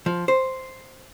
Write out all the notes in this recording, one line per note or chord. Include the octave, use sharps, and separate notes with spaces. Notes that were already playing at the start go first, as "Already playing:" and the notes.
F3
C5